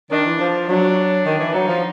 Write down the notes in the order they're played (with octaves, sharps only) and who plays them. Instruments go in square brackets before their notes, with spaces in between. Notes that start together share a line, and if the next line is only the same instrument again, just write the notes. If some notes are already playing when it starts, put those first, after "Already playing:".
[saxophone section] D#3 [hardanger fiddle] D4
[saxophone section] E3
F3
[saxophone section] F#3 [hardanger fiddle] D4
[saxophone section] D#3
E3
[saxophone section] F#3 [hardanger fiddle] D#4
[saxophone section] F3